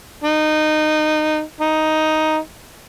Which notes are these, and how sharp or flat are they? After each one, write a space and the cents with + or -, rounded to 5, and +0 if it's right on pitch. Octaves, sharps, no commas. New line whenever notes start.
D#4 -20
D#4 +5